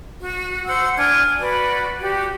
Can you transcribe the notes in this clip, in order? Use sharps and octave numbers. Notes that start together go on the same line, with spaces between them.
F#4
C5 F#5 E6
D4 G#5 F6 G#6
F#4 B4 D5
F#4 G4